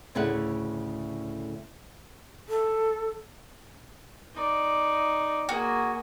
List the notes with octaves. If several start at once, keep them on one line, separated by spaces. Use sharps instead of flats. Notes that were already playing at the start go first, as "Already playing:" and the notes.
D2 A2 C#3 A3 E5 F#5
A4
D#4 D5
A#3 F#4 G#4